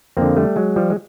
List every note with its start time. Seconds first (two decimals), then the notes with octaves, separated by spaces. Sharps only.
0.17 F2 D3 A#3 C4
0.36 G3 A3
0.56 F#3 G#3
0.76 F3 G3
0.90 G#3